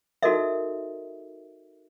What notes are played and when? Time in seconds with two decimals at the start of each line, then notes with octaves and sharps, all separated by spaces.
0.23 D#4 F#4 A4 A#4 D#5 E5